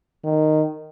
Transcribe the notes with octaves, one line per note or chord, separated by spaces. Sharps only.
D#3